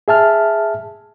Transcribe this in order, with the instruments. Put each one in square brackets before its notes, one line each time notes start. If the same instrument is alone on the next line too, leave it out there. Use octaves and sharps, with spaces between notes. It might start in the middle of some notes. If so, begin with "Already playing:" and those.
[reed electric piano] G#4 E5 A5 F6